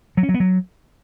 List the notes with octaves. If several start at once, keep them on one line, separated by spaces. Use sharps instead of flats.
F#3
C#4
F#3
B3
F#3